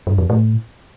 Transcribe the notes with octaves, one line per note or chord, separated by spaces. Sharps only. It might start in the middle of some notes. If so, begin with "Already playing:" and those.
G2
F2
A2